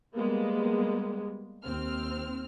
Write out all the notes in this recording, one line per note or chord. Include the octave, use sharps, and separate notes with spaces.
G3 G#3 A#3 B3
D#2 C4 F6